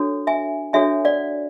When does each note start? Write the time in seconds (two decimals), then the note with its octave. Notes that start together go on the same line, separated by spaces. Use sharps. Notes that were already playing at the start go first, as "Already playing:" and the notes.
Already playing: D4 F#4 A4 C#5
0.27 E5 G#5
0.73 D4 F#4 A4 C#5 E5 G#5
1.05 D5 F#5